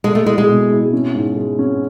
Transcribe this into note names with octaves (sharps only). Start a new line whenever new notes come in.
G#3 A4
A3
G#3 E4
G#3
B2
E4
C#4
G#2
G#3
C#4